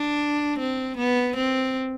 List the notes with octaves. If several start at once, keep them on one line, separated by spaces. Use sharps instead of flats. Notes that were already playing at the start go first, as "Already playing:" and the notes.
Already playing: D4
C4
B3
C4